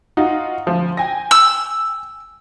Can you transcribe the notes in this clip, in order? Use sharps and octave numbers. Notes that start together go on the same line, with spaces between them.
D#4 F4 F#4
D2 F3
G5 G#5 A#6
E6